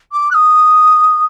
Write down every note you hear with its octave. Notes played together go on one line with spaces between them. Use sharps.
D6
F#6
D#6